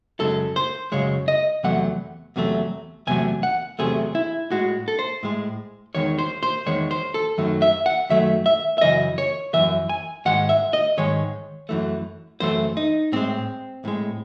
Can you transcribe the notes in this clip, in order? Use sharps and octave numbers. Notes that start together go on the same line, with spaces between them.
F#2 C#3 G#3 A4
C5
F#2 C#3 G#3 C#5
D#5
E2 C3 F#3 A3 F#5
E2 C3 F#3 A3
E2 C3 F#3 A3 G#5
F#5
E2 C3 F#3 A3 G#4
E4
A2 G#3 F#4
A4
C5
A2 G#3
E2 D#3 G#3 C#5
C5
C5
E2 D#3 G#3 C#5
C5
A4
F#2 D#3 F#3 A3
E5
F#5
F#2 D#3 F#3 A3 E5
E5
E5
F#2 C#3 E3 D#5
C#5
F#2 C#3 E3 E5
G#5
G#2 D#3 G#3 F#5
E5
D#5
G#2 D#3 G#3 C#5
F#2 E3 A3
F#2 E3 A3 C5
D#4
A2 G#3 C4
A2 G#3